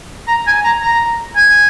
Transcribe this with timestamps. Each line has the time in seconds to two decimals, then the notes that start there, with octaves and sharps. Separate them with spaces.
0.28 A#5
0.47 G#5
0.64 A#5
0.82 A#5
1.36 G#5